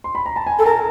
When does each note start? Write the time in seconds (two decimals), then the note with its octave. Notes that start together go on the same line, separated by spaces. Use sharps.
0.04 C6
0.15 B5
0.26 A#5
0.36 A5
0.47 G#5
0.59 A4
0.65 A#4 A5